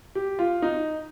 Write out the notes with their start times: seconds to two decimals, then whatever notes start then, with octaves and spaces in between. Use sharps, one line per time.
0.15 G4
0.39 F4
0.62 D#4